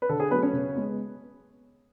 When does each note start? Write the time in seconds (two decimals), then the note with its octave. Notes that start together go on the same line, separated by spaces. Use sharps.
0.02 B4
0.09 D3 A4
0.20 G#4
0.31 F#3 A3 B3 B4
0.43 C#4 C#5
0.53 C#3
0.75 G#3 B3